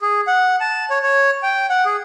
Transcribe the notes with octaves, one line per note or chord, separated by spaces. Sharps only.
G#4
F#5
A5
C#5
C#5
G5
F#5
G#4